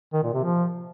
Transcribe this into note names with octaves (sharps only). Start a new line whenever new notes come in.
D#3
A#2
C3
F3